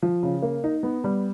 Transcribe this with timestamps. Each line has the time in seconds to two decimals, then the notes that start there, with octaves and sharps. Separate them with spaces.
0.02 F3
0.23 C#3
0.42 A#3
0.64 D#4
0.83 B3
1.04 G3